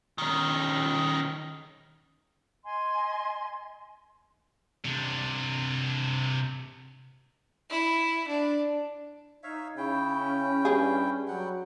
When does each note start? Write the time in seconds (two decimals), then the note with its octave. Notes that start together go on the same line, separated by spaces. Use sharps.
0.18 D#3 C#4
2.65 D#5 G#5 C6
4.85 C3 D4
7.70 E4
8.27 D4
9.43 D#4 C#5 E5 F5
9.77 C#3 C#4 E4 G5
10.65 G2 G4 G#4
11.28 F#3 G3 F#5 G5